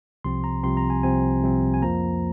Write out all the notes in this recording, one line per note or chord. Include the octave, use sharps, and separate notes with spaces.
C2 C3 F3 C4 C6
A#5
C2 C3 F3 C4 C6
A#5
G#5
C2 C3 F3 C4 G#5
C2 C3 F3 C4
G#5
F2 F3 A#3 A#5